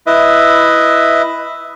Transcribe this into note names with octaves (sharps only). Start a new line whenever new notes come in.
E4 B4 D#5 E5